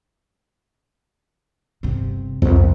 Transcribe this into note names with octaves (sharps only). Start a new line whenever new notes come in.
G1 C3
C2 F2 E3